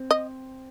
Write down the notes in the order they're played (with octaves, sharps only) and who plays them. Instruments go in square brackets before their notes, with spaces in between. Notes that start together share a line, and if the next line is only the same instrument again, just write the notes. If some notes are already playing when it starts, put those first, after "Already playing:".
Already playing: [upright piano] C4
[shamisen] D#5